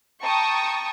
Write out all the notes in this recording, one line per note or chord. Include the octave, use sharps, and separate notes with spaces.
G5 A5 A#5 C#6 D#6